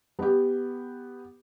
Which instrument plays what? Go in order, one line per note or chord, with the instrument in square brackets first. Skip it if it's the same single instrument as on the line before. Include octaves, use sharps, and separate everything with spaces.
[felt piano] B3 G4